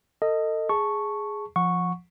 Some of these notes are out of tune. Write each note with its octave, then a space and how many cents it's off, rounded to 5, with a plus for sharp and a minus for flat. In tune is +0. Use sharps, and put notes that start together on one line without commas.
A4 +35 D#5 +0
G#4 +0 A5 +0 C#6 +0
F3 +0 F#5 -20 C#6 +0